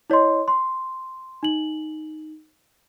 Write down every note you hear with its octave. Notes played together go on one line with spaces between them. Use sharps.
E4 C#5 D#5 C6
C6
D#4 F#7